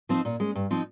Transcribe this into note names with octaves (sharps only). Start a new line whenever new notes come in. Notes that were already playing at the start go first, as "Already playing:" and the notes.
F3 C4 D#4
A#2
G#3 C#4
G2
F3 C4 D#4